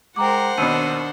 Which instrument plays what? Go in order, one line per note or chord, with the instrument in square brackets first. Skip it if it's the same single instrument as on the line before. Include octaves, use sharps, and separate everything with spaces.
[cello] G#3 A#4 [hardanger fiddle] C5 F#5 [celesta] G5 A#5 D6
[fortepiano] D#2 B2 [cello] D#3 D4 [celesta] E6 C#7 D#7